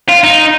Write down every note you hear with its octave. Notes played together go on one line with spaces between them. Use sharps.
F4
D#4